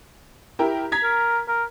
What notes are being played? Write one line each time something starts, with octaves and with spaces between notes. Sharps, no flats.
E4 G4 A#4
A#5 G#6 B6
A#4
A#4